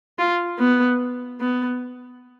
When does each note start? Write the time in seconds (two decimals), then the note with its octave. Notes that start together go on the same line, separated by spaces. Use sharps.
0.19 F4
0.59 B3
1.40 B3